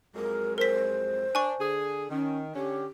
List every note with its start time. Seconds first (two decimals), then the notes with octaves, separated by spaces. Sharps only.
0.15 F2 F#3 G#3 A#4
0.58 A#4 C5 B6
1.35 D4 G#5 C#6
1.60 D3 G#4
2.10 D#3 C#4
2.55 D3 C#4 G4